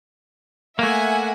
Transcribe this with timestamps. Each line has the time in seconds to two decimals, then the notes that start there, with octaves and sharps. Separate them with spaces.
0.79 A3 A#3 E5 F#5 G#5